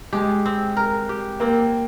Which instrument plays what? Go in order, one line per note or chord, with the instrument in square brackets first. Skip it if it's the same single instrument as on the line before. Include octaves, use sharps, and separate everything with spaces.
[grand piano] G#3 [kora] G4
[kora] C4
A#4
G4
[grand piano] A#3 [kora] C4